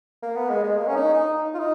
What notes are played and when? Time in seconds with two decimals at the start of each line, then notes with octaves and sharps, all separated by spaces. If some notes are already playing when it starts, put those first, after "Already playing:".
0.23 A#3
0.36 B3
0.50 G#3
0.64 G#3
0.77 A#3
0.87 C#4
0.95 D#4
1.14 D#4
1.54 F4
1.59 D#4